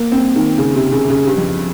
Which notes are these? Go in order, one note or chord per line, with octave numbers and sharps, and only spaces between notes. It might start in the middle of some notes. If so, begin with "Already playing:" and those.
Already playing: A#3
C4
D#3
C#3
C3
C#3
C#3
G2
F2